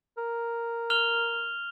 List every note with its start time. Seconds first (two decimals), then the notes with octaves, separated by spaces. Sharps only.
0.18 A#4
0.90 F6 F7 G7